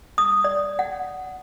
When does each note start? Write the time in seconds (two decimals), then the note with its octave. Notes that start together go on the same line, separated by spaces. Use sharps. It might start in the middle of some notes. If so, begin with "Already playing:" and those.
0.18 D#6
0.44 D5
0.79 F#5